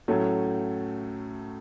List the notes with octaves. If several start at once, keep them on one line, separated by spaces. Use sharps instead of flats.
A2 F#3 A3 C#4